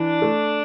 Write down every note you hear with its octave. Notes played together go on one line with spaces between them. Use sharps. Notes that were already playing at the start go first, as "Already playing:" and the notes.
Already playing: E3 D4
A3